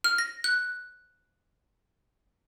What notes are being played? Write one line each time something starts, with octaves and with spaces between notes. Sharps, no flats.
F6
A#6
F#6